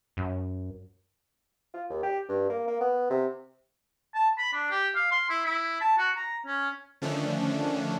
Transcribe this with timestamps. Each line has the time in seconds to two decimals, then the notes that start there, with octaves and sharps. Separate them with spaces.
0.17 F#2
1.74 F4
1.90 D#2
2.03 G4
2.29 G2
2.50 A#3
2.68 A#3
2.81 B3
3.10 C3
4.15 A5
4.38 B5
4.53 D4
4.70 G4
4.95 F5
5.11 C6
5.30 E4
5.45 E4
5.81 A5
5.98 F#4
6.16 A#5
6.46 C#4
7.02 D3 D#3 F3 A3 C#4 D4